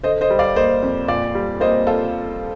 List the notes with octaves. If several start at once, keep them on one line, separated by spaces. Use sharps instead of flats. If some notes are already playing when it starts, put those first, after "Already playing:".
D3 C5 D#5
C5 D#5
G3
D5 F5
A#3 C5 D#5
F2
A#2 D5 F5
G3
A#3 C5 D#5
F4 A4